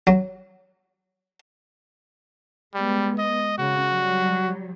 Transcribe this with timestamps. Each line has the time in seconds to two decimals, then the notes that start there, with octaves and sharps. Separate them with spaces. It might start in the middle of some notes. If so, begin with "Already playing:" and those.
0.07 F#3
2.74 G3 G#3 B3
3.18 D#5
3.58 C#3 F#4
3.88 F#3 G3